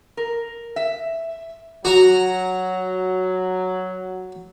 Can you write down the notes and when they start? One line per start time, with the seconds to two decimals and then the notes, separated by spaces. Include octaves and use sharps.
0.17 A#4
0.76 E5
1.85 F#3 F#4 A#5